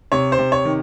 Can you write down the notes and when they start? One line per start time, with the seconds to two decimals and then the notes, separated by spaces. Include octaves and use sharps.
0.12 C3 C#5
0.32 C5
0.38 C3
0.52 C#5
0.65 D#3